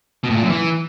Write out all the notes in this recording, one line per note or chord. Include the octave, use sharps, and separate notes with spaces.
B2
A2
A#2
F#2
E3